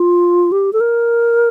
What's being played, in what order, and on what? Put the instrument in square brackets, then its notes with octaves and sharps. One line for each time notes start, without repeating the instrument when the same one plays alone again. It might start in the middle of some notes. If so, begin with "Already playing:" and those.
Already playing: [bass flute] F4
G4
A4
A#4